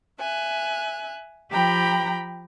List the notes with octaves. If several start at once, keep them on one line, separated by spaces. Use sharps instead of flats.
E5 G#5 F#6
F3 G4 G5 A#5 B5